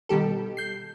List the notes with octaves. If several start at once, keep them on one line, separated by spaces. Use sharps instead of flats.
B2 D#3 G3 G4 A4
G6 C7